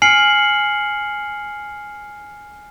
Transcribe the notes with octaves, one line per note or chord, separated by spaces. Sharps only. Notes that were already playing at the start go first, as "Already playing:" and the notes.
G#5 F6 C7 C#7 F#7